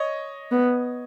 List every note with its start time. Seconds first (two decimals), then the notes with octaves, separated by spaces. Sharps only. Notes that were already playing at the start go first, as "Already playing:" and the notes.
Already playing: C#5 D#5
0.52 B3